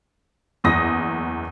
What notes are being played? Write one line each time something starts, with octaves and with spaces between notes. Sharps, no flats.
F#1 E2 D#6 A#6